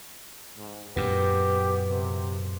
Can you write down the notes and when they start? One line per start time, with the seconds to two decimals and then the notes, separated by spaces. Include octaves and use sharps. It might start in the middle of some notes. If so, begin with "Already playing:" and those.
0.56 G#2
0.96 F#2 A#2 B3 G4
1.89 C3